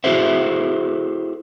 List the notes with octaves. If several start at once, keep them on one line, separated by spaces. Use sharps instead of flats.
E4 F#4 G#4 A4 C5 E5